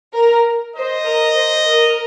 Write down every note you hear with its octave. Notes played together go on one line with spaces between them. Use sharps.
A#4
C5 D#5
A#4
C5
A#4